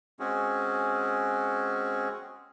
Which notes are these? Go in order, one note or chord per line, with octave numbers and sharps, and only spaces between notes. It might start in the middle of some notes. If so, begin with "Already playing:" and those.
G#3 C4 C#4 F#4 G#4